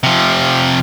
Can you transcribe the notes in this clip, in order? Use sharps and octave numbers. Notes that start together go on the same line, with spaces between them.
C3 F3